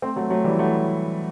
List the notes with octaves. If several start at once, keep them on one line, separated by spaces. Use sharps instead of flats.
A3 C4
F#3 A3
F#3 A3
E3 G3
F#3 A3